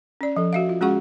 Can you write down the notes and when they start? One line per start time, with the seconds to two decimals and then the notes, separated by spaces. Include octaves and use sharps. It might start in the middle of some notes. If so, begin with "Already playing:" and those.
0.21 C#4 D5
0.36 F3 A4
0.53 F#4 E5 F5
0.69 F4
0.81 G#3 C#4 F#4 G#4 F#5 C#6